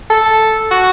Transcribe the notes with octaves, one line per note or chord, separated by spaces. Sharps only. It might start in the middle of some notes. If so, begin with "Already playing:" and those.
A4
F#4